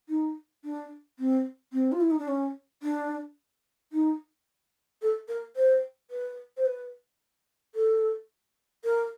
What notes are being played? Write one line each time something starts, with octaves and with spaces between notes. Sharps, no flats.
D#4
D4
C4
C4
F4
E4
D#4
D4
C#4
D4
D#4
A4
A#4
C5
B4
C5
B4
A4
A#4